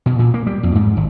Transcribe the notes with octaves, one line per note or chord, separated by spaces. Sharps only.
B2
A#2
A#3
G3
F2
G#2
G#1